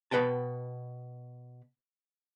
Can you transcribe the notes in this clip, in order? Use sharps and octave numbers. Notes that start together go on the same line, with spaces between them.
B2 B4 F#5 G5 A5